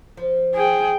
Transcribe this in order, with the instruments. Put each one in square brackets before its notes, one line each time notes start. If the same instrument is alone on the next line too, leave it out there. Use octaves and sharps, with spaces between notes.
[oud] F3
[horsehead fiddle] G#4 G5